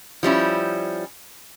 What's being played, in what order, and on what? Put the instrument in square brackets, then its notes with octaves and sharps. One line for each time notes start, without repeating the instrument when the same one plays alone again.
[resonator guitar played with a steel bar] F3 G3 C#4 E4